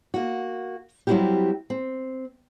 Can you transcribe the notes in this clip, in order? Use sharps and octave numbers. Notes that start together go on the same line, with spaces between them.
A#3 F#4
F#3 G3 C4 E4 F#4 G4
C4